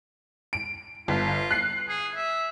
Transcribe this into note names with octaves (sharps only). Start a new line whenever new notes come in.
D7
G1 F4
F#6 C7
G#4
E5